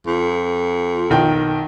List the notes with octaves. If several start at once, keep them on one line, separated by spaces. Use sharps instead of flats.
F2
B1 D#3 G5